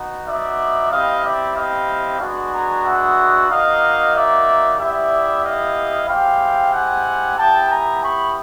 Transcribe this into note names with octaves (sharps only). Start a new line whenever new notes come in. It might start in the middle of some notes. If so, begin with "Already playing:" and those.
Already playing: B3 D#4 F#4
D5 E5
C4 E4 G4 D#5 F5
D5 E5
D#5 F5
G#3 B3 D4 F#4
G#5 A#5
E5 F#5
A#3 D#4 F#4 D#5 F5
D5 E5
B3 E4 G4 D5 E5
D#5 F5
G#3 C4 E4 G4 F5 G5
F#5 G#5
B3 E4 G4 G5 A5
G#5 A#5
B5 C#6